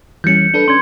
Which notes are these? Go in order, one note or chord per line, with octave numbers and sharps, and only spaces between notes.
E3 G3 C#4 G6 C#7
D4 A4 B4
C#4 C6 G#6